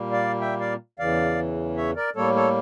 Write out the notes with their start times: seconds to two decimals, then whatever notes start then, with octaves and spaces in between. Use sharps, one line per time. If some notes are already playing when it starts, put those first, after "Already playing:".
Already playing: A#2 G3 A#3
0.12 D5 F5
0.41 E5 G5
0.60 D5 F5
0.99 E2 C#3 E3 D5 F5
1.77 C#5 E5
1.96 A#4 D5
2.15 A2 G3 A#3 A4 C#5
2.35 A4 C#5